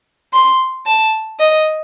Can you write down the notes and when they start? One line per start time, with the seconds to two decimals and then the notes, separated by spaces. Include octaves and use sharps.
0.33 C6
0.86 A5
1.40 D#5